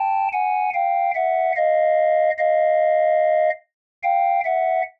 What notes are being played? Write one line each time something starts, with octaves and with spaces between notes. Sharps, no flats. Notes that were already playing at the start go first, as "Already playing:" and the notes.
Already playing: G5 A5
F#5 G#5
F5 G5
E5 F#5
D#5 F5
D#5 F5
F5 G5
E5 F#5